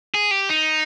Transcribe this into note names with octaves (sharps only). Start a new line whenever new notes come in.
G#4
G4
D#4